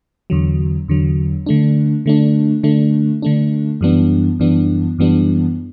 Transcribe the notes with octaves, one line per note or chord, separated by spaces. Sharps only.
E2 D3 F#3
E2 D3 F#3
D3 A3 D4
D3 A3 D4
D3 A3 D4
D3 A3 D4
F#2 E3 G3 B3 D4
F#2 E3 G3 B3 D4
F#2 E3 G3 B3 D4